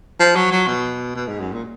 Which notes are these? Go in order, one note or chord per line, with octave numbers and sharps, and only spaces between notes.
F3
F#3
F#3
B2
B2
G#2
F#2
A#2